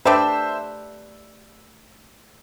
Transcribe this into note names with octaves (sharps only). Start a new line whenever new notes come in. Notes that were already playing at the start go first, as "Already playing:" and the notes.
A3 D4 G4 B4 C5 E5